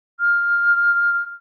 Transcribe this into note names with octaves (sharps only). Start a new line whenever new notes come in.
F6